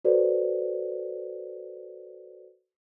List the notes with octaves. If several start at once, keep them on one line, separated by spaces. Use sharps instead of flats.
F#4 A4 B4 C5 D5